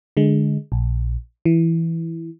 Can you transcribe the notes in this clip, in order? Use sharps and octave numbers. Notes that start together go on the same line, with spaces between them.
D3 G#3
A#1
E3